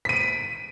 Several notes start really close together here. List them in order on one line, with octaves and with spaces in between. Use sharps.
B6 D#7 D7